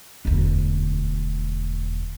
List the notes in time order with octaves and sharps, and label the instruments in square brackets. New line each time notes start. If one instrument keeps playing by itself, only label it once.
[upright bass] E1 D2